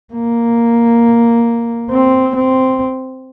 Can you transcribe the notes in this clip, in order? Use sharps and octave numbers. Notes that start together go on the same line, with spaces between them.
A#3
C4
C4